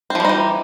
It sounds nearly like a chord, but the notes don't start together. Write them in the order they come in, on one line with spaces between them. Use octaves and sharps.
C4 F3 G3 D#4 E3